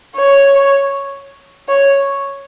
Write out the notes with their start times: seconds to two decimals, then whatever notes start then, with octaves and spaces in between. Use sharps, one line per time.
0.16 C#5
1.68 C#5